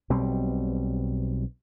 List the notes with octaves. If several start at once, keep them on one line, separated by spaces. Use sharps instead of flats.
B1 B2 G3 C4